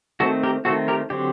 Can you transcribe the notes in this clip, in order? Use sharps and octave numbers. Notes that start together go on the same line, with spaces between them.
D#3 A3 C4 F#4 A4
G4 A#4
D#3 A3 C4 F#4 A4
G4 A#4
D3 F#3 C4 G4